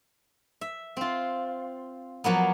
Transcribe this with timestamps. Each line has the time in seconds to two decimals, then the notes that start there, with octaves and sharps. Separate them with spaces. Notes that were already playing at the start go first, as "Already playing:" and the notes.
0.61 E5
0.97 C4 F4
2.24 F3 F#3 A#3 B3